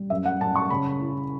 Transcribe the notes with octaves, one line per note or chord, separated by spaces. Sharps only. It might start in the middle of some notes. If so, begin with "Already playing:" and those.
Already playing: G3
F#2 E5
F#5
F#2 A5
C#6
C#3 B5
E4